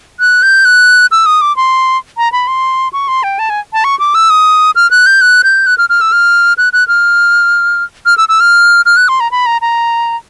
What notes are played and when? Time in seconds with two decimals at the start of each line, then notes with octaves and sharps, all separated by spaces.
0.20 F#6
0.43 G6
0.65 F#6
1.11 E6
1.26 D#6
1.41 D6
1.57 C6
2.17 A#5
2.32 B5
2.47 C6
2.93 C#6
3.08 C6
3.23 G5
3.39 A5
3.50 G#5
3.73 A5
3.84 C#6
3.99 D6
4.15 E6
4.30 D#6
4.76 F6
4.91 F#6
5.06 G6
5.21 F#6
5.44 G6
5.67 F#6
5.78 F6
5.90 F6
6.01 E6
6.12 F6
6.58 F#6
6.73 F#6
6.88 F6
8.06 F6
8.18 E6
8.29 E6
8.40 F6
8.86 F6
8.97 F#6
9.08 C6
9.20 A#5
9.31 B5
9.46 A#5
9.61 A#5